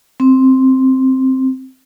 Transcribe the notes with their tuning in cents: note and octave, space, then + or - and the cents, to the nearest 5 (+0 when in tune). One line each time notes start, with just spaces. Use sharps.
C4 +5